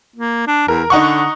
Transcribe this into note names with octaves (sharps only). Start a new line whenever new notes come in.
A#3
D4
E2 A#4
D3 D#4 F#5 C#6